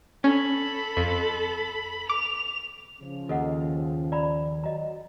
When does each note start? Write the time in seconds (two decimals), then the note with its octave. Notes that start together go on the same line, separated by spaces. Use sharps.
0.24 C#4 A4 B5
0.97 F2
2.09 D6 F7
3.00 C#3 F3
3.29 D#2 A4 D#5 F#5
4.12 D5 A#5 B5
4.64 F#3 D#5 A#5